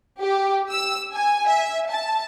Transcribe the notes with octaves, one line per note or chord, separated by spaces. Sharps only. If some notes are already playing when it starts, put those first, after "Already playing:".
G4
E6
G#5
E5
A5